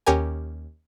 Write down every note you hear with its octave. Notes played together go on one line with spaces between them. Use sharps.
D#2 C#4 G4 A#4 G#5